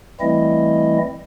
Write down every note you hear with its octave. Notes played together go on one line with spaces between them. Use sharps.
E3 G3 A3 C4 E4 D#5